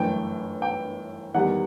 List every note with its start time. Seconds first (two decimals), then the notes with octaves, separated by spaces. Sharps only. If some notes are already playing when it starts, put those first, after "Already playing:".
Already playing: G1 F#2 E3 A3 G5
0.62 G5
1.35 E2 D#3 G3 F#5